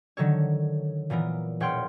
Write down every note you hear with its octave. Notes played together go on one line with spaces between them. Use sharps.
D3 D#3 F#3 A4 C#5
A#2 E3 B3 A#4
E1 C#5 F#5 G5 C6 F6